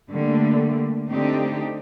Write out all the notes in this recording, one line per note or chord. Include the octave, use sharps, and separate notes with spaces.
D3 G3 A3 A#3
D3 A3 C4 D4 D#4 G4